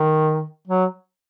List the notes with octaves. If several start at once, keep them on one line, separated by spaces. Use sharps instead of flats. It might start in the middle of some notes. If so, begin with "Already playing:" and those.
Already playing: D#3
F#3